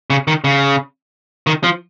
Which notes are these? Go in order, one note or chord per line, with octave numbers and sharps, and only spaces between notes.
C#3
D#3
C#3
D#3
F3